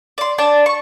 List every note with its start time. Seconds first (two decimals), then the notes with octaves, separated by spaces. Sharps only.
0.18 D5 C6
0.38 D4 D5 A5
0.66 C#6